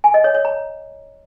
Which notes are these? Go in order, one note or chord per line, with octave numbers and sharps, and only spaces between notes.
G#5
D#5
C#5
C#5
A#5